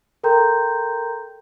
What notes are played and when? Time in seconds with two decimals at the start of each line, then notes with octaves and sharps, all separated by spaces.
0.23 A4 A#4 G5 A#5 C6 G6